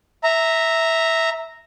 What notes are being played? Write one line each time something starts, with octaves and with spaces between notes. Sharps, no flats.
E5 A#5